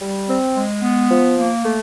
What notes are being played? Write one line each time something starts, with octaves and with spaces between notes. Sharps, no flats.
G3
C4
G#3
B3
F3
A#3
A3